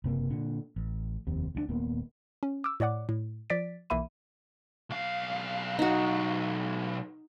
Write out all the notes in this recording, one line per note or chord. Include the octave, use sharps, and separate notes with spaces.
F#1 C3 A#3
A#2 D3
A1
F1 D#2 C3
D2 F#3 D4
D#1 A#2 A#3 B3
C#4
D6 E6
A2 C#5 D5 F#5 D6
A2
F3 D5 A6 B6 D7
B1 E3 A#3 E5 B5 D#7
B1 F5
D#4 F#4